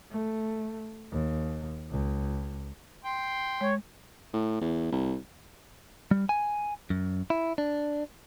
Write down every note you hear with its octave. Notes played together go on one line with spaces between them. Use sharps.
A3
D#2
C#2
G5 C6
G#3 C#5
A2
E2
C2
G3
G#5
F#2
E4
D4